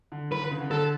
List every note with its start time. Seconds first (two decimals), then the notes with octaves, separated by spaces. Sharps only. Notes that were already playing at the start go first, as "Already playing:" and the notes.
0.12 D3
0.31 E3 B4
0.42 D3
0.51 C#3
0.60 D3
0.71 D3 A4